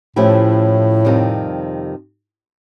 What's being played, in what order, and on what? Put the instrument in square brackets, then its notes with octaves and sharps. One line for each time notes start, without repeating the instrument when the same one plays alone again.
[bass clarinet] A2 [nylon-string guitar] F3 A3 C#4 E4 G4
[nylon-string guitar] F2 C3 D#3 G3